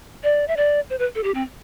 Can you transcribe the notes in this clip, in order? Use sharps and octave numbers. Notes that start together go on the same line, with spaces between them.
D5
E5
D5
C5
B4
A4
G4
C4